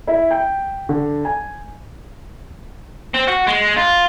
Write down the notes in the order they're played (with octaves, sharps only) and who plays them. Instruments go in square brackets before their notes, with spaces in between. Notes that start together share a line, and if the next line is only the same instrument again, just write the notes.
[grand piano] E4
G5
D3
G#5
[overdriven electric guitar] C4
F#4
G#3
F4